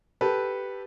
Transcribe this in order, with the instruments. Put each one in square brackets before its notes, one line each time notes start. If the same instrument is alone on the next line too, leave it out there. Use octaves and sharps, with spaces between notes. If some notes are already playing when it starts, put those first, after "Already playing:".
[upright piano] G4 A4 B4